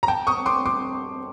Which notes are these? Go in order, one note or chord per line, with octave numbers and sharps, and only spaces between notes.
A#5
G5 A5
C#6 D#6
C6 D6
C6 D6